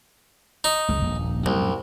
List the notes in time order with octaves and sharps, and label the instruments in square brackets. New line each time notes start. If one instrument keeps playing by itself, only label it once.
[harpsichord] D#4
[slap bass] F#1 C#2 G#3
D#1 A#1
[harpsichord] C2 [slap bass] F#2 A#2 G#3